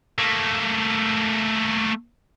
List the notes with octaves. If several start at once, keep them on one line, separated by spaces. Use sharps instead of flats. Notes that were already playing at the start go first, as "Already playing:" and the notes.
A3 A#3